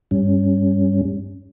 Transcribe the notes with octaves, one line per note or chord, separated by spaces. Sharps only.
G2 G3 C#4